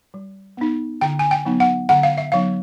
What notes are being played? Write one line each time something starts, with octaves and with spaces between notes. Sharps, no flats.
G3
B3 D#4
D3 G5
G#5
G5
F#3 B3 D#4
F#5
D3 F#5
F5
E5
F#3 B3 D#4 F5